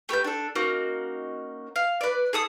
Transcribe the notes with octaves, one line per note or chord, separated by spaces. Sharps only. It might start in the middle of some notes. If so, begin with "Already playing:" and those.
A3 G4 B4 G6
D4 A4
A#3 C#4 D#4 F#4
F5
B4 D5
G#4 A4 D#6